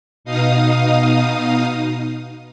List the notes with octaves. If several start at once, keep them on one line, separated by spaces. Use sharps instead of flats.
B2 D#4 F5 D#6